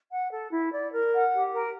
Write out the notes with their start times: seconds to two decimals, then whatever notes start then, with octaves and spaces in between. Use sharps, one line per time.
0.11 F#5
0.32 A4
0.52 E4
0.72 D5
0.92 A#4
1.13 F#5
1.33 G4
1.54 A#4